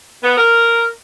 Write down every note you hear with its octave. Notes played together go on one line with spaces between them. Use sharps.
B3
A#4